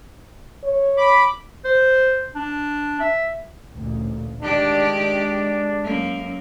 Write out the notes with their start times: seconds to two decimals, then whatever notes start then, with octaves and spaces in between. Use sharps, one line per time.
0.64 C#5
0.97 B5 D6
1.65 C5
2.35 D4
3.00 E5
3.72 A1 D2 A#2
4.42 D#3 G#3 D4 G4 D5
4.96 D4
5.84 F#2 A#3